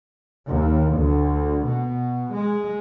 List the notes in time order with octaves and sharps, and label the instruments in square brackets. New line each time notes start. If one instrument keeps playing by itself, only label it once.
[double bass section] D#2
D2
B2
G#3